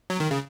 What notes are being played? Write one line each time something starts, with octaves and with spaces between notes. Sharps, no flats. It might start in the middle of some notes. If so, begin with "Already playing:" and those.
F#3
D#3
C#3